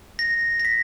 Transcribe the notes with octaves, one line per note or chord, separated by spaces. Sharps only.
A#6
A#6
B6